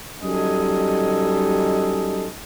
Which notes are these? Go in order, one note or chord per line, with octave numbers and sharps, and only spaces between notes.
F#2 G3 D#4 A4 D#5 G#5